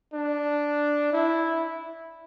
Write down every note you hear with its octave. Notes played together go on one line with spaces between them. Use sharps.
D4
E4